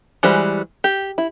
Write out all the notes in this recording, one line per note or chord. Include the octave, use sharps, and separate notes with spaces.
E3 G3 G#3 F#4 C5
G4
E4